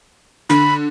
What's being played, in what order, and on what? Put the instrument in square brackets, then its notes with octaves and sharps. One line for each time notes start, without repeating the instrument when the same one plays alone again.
[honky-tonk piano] D3 [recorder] B5